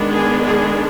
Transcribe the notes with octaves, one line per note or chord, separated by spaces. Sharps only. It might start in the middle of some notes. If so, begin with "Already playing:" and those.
Already playing: D#3 G#3 B3 D4
G#4
G#4